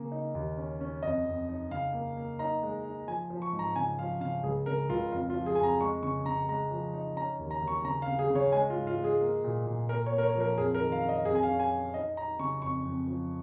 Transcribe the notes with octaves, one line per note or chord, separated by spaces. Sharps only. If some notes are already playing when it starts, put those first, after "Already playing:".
Already playing: C#3 A#3
D#4
D#2
C#4
C#4
F2 D#5
F2
D#4
C#3 F5
A#3
A#3
D#4 A#5
G#3
D#4
F3 G#5
F3
C#6
G#2
A#5
C#3 G#5
F3 F5
C#3 F5
C#2 G#4
C#3 A#4
C#2 F4
F2 F4
F4
F3
G#4
F2 G#5
A#5
G#3 C#6
C#3 C#6
C#3 A#5
G#3 A#5
F3
D#4
C#4 A#5
D#2
A#5
D#2
C#6
C#3 A#5
F5
C#3
G#4
C#3
C#5
G#3 G#5
F4
G#2
F4
G#3
G#4
A#3
A#2
A#2
A#3 A#4
C#5
A#3
A#4
C#5
F3
A#4
F2 G#4
A#4
D#3
F5
C#4
D#5
F2 G#4
G#5
F5
C#4
G#5
C#4
D#4 D#5
D#4 A#5
C#3 C#6
F2 C#6
F2
F3